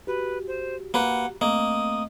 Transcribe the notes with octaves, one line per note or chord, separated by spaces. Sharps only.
F#4 G4 B4
C5
A#3 B4 F#5
A3 A#3 C4 D#5 D#6